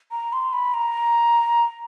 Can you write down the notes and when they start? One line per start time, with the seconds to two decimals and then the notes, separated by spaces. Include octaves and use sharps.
0.11 A#5
0.33 C6
0.53 B5
0.74 A#5